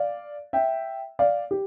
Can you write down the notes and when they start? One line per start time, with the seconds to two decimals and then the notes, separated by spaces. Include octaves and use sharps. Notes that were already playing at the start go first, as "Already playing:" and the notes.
Already playing: D5 F5
0.53 E5 G5
1.19 D5 F5
1.51 G4